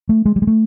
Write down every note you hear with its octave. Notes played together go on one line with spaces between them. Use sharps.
A3
G#3
G3
G#3
A3